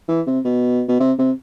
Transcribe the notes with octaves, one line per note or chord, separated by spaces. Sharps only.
E3
C3
B2
B2
C3
C3